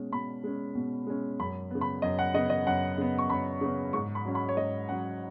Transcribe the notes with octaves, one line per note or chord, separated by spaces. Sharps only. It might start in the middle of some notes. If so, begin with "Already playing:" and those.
Already playing: B2 G#3 C#4
B2 B5
G#3 C#4
B2
G#3 C#4
F#2 B5
C#3 B3
B5
F#2 D#5
F#5
C#3 B3 D#5
D#5
F#2 F#5
C#3 B3
C#6
F#2 B5
C#3 B3
G#2 C#6
B5
F#3 C#4
B5
C#5
G#2 D#5
F#3 C#4 F#5